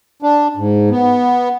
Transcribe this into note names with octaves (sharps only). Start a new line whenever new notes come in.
D4
G#2
B3